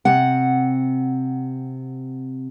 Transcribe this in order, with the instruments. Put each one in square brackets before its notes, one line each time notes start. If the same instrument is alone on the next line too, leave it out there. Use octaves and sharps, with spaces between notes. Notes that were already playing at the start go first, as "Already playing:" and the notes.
[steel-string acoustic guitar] C3 F#5